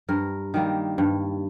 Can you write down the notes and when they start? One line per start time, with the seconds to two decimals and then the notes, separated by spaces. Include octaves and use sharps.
0.09 G2 A#4
0.54 D#3 G3 A#3
0.98 G2